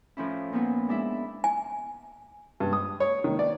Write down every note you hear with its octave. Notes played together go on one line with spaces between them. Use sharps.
A2 F3 C#4 E4
A#2 F3 A#3 B3 E4
G#3 D4 E4 E5
G#5
G2
D#6
C#5
D#3
D5